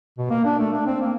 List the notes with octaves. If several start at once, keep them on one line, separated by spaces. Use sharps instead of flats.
B2
A#3
D4
A3
D4
C4
A#3